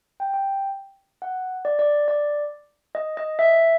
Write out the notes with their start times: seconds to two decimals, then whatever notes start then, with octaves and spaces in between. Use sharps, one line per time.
0.20 G5
0.34 G5
1.22 F#5
1.65 D5
1.79 D5
2.08 D5
2.95 D#5
3.17 D#5
3.39 E5